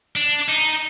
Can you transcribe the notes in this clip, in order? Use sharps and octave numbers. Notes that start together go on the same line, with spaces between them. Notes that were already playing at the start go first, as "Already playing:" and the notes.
D4
D#4